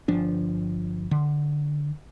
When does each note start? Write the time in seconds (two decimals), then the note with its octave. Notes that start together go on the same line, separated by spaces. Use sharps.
0.08 G1 F3 D4
1.11 D3